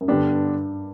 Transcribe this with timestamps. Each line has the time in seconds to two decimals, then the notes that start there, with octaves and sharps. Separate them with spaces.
0.01 F#2
0.08 G2 D3 G3 B3 D4 G4